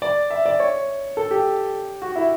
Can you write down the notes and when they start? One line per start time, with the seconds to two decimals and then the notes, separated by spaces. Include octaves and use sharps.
0.02 D5
0.31 E5
0.46 D5
0.60 C#5
1.17 A4
1.31 G4
2.02 F#4
2.16 E4